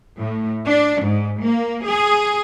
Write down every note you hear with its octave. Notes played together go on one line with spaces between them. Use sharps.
A2
D4
G#2
A#3
G#4